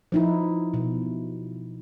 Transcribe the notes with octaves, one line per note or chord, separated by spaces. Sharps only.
F3 D#4 E4
B2